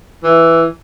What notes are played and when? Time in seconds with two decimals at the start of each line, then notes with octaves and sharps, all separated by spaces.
0.23 E3